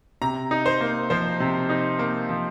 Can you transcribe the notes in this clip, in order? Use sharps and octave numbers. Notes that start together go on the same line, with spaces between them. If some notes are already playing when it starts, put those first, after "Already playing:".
C3 A#5
D#4
C5
A#3
F3 C5
C3
D#4
A#3
F3